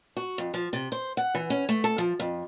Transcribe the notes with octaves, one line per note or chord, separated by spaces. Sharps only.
F#4
F2
F3
C3
C5
F#5
E3
C#4
A3
A4
F3
F2